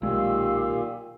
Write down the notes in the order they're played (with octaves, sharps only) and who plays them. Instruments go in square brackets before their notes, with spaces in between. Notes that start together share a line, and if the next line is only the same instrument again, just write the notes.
[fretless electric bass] B1 G#3 [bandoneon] A#2 D#3 [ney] G4 [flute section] F5 E6